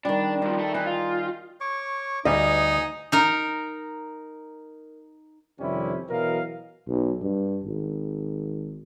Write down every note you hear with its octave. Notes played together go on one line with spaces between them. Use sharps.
D#3 G3 D4
G2 F3 D#4
A3 A4
E3 D#4 G#5
F4
C#5 C#6 D6
D2 G3 D#4 D#5 G#5 D#6
D#4 A#4
F2 C3 D#3 G3 C#4 E4
B2 E3 F#3 A#4 D#5 F5
B1
G2
G#1